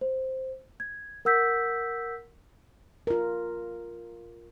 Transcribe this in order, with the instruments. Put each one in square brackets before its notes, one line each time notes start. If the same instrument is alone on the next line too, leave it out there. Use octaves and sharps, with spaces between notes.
[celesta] C5
G#6
A#4 F#5 E6 G6 B6
[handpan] F4 A#4